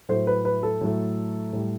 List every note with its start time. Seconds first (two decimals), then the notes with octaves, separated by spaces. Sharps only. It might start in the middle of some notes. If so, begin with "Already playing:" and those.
0.09 A2 F#3 A3 C5
0.27 B4
0.45 B4
0.63 A4
0.81 A2 F#3 A3
1.53 A2 G3